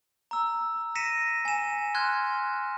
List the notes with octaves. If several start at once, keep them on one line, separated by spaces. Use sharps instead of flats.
A#5 E6
A#6 B6 C#7 D#7 E7
G#5 E7
C6 F6 F#6 G#6